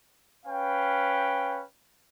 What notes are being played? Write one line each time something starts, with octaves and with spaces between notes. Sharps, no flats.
C#4 B4 F5 G5